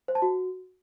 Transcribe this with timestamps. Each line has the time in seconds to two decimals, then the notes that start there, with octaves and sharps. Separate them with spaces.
0.08 C5
0.15 A5
0.22 F#4